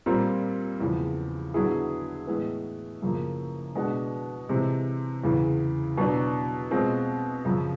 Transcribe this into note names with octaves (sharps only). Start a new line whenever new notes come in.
A#2 G3 C4 F4 A#4
E2 C#3 F3
D3 F#3 B3 E4 G#4
A2 E3 G#3 B3
F#2 C#3 F3 A#3
B2 G#3 B3 D4 F#4
C3 E3 G#3 C4
E2 C#3 E3
B2 F#3 B3 D4
B2 G#3 C4 F4
F#2 C#3 F3